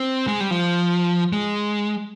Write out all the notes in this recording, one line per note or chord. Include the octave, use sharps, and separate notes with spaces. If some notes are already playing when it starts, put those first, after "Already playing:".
Already playing: C4
G#3
G3
F3
G#3